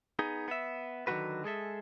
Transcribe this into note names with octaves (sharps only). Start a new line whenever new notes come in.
B3 D#4 G#4
B3 E5
D3 D#3 F#3 A3 F#4 B4
G#3 G#4 A4 E5